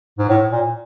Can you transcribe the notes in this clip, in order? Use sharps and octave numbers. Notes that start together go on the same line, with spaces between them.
G#2
A2
A#2